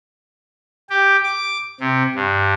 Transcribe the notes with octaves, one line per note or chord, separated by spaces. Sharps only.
G4
D6
C3
G2